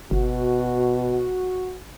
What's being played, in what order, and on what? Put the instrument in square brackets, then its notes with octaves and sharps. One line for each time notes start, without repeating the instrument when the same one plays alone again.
[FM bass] G1 [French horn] B2 [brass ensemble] F#4